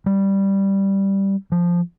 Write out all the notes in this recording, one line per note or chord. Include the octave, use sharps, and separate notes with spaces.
G3
F3